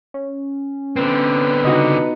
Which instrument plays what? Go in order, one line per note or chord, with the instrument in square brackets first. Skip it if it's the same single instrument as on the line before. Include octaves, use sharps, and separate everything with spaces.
[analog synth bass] C#4
[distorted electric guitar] D3 C4 [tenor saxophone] B3
[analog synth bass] C#3 [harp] D#4 F#4 D#5